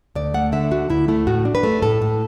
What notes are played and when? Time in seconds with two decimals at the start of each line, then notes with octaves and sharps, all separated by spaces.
0.15 D2 D5
0.34 A3 F#5
0.52 D3 E5
0.71 D2 F#4
0.90 D2 E4
1.08 A3 E4
1.27 A2 F#4
1.45 D4
1.55 B4
1.63 A3
1.82 A2 A4
2.02 A2